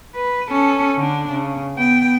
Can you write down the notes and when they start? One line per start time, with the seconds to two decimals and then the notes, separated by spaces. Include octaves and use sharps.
0.16 B4
0.51 C#4 A4
0.97 D3 D4
1.31 C#3
1.76 B3 G5